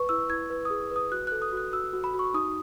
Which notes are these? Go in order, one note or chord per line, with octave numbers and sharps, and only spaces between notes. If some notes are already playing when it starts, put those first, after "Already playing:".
Already playing: B4 C#6
E4 E6
E4 G#6
B4
G#4 D#6
B4
D#6
F#4 F#6
A4 F#6
D#6
F#4 F#6
F#4 E6
F#4
B5
F#4
C#6
D#4 D#6